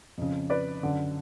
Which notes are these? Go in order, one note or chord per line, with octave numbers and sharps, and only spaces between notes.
F2 C#3
B4 D5
F#2 D3